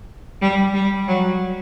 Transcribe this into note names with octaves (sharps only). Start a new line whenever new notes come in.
G3
G3
F#3